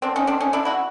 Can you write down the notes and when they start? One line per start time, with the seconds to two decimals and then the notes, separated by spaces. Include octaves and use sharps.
0.02 C4 D4
0.16 C#4 D#4
0.27 C4 D4
0.40 C#4 D#4
0.53 D4 E4
0.65 E4 F#4